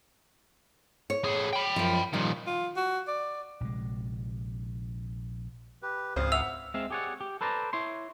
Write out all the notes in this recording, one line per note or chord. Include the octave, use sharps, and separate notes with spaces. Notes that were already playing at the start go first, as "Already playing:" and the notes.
C#5
A2 G#4
G5 B5
F#2 F3
A#2 D#3 F3 G3
F4
F#4
D5
A#1 C3 G#3
G4 B4
G#1 C#2 C5 F5 D#6
E5 F#5 E6 F7
G#3 C4 E5 F5
G4 G#4 C#5 D5 F#5
G4
A4 B4 C5 D5 A#5
E4 C#5 C6